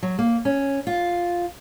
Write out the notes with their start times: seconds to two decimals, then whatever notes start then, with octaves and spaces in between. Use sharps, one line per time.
0.03 F#3
0.19 A#3
0.45 C#4
0.87 F4